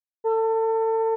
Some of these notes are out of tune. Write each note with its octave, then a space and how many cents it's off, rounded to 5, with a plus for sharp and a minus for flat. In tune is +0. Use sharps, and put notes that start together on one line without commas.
A4 +30